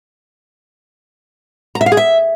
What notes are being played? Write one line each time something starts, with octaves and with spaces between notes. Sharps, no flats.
A#5
E5
F5
G#4
E5